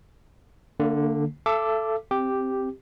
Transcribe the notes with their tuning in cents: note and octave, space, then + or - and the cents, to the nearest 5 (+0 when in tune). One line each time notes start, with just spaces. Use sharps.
D3 +0 A#3 -35
A4 +0 E5 +40 D6 +0
C4 +0 G4 +0